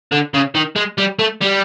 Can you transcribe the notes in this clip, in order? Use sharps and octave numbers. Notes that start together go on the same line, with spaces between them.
D3
C#3
D#3
G#3
G3
A3
G3